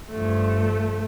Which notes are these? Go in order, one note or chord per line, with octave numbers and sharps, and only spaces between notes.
G2 F3 A3